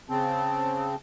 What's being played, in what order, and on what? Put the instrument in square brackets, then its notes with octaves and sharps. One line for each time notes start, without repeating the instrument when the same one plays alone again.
[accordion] C#3 C4 [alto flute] A5